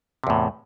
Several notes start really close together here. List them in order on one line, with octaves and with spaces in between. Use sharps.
C3 E2 A2